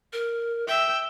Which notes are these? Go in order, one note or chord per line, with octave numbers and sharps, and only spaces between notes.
A#4
E5 G5 E6